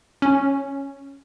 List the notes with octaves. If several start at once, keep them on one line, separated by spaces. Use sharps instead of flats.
C#4